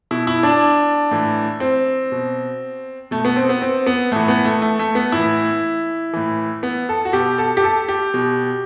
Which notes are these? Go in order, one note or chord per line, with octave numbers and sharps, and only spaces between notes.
B2 E4
E4
D4
A2 E3
C4
B2
B2 A3
B3
C4
B3
C4
B3
A2 E3 A3
B3
A3
A3
A3
B3
A2 E3 E4
A2 E3
B3
A4
F#4
B2 G4
A4
G4
A4
G4
B2